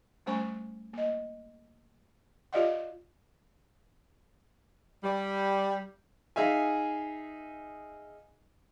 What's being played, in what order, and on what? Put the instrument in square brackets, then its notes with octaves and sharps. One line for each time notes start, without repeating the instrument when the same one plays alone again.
[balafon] G3 A3 C#4 C5 G#5 C#6
A#3 D#5
F4 G4 D5 D#5 F5 F#5
[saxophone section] G3
[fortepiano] D#4 G#4 E5 F5 G#5